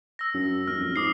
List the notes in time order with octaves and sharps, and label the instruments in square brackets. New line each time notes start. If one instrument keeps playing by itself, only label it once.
[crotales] E6 A#6
[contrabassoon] F#2
[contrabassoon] D#1 [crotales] F6
[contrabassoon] F2
[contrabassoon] G#2 [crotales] D6 D#6 C7